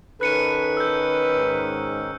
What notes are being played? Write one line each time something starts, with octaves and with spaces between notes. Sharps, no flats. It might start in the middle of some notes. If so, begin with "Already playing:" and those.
D#3 C#4 D#4 A4 B4 F#6 C#7 D#7
E6 G6
G#2